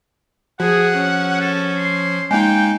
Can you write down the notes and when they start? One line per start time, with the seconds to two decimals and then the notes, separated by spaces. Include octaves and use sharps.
0.60 F3 F#4 G#4 F#5
0.97 C#4
1.41 A4
1.78 C6
2.31 G#3 A#3 D#4 G5 G#5